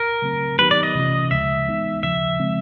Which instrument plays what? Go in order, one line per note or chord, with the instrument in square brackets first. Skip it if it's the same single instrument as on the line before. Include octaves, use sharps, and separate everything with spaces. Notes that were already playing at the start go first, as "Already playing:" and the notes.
Already playing: [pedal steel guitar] A#4
[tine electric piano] C#3 F#3 A3 C4
[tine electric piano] D#3 F#3 B3 D#4 G4 [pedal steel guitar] B4
[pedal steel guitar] D5
D#5
[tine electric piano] C3 E3 A3 C#4 F4
[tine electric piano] D2 C#3 F3 G#3 [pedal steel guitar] E5
[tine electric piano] E3 G#3 B3 D#4
[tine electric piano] D#2 C#3 F3 [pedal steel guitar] E5
[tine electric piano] C#3 F3 G#3 C4